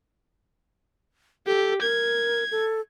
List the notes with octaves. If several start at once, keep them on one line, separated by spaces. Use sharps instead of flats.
G4 A4
A#4 G#6
A4